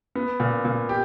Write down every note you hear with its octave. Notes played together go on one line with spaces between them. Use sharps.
B3
A#2
A#2
G4